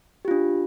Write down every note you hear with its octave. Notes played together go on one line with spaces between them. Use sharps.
D4 F4 G4